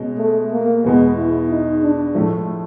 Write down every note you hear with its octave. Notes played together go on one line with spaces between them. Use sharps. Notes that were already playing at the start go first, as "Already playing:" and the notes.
Already playing: B2 G#3 C#4
A3
A#3
E2 B2 G#3 B3
E4
D#4
D4
A2 F3 A3